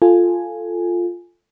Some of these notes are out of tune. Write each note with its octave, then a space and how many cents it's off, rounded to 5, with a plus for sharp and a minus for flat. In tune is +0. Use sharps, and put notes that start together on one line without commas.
F4 +0 A4 +0 G#5 +0